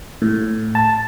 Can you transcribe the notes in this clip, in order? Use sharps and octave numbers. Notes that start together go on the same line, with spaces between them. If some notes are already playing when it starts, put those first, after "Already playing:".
A2
A5